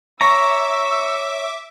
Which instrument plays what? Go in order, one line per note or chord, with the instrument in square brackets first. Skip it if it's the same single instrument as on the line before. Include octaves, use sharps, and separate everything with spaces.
[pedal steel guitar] C#5 A#5 [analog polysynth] E5 D6 [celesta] C#6 [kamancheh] E6